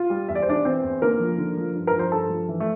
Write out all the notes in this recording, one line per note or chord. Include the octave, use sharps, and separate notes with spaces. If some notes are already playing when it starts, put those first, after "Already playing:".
Already playing: F4
G3
E2 E5
D5
C5
E2 D4 D5
E3 C4 C5
E2
D3 A#3 A#4
F3
D3
F3
G2
A#4 A#5
F3
C5 C6
G2 A4 A5
F3
E3
A3